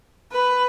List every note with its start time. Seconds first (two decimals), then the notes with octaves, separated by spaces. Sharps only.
0.32 B4